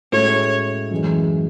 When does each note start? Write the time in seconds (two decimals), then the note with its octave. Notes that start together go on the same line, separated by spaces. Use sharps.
0.12 A2 G#3 C#4 F#4 A4 C#5
0.91 F#2 E3 G#3